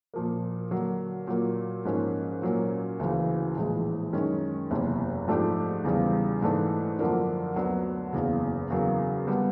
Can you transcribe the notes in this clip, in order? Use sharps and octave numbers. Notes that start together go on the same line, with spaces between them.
A#2 F3 A#3
D3 F#3 A#3
A#2 F#3 A#3
G#2 F3 A#3 C#4
A#2 F#3 A#3 C#4
D2 C#3 E3
A#1 A2 E3 G#3
F#2 D#3 G#3 C#4
F#1 E2 C3
G#2 F3 A3 D4 G4
E2 C#3 E3 G3
G#2 E3 A3 D4
F#2 D3 F3 A#3 D4
D2 D3 F#3 B3 D4
F#1 E2 C#3
E2 C#3 F#3 A#3
D3 G3 B3